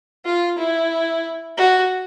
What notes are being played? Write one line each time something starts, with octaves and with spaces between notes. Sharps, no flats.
F4
E4
F#4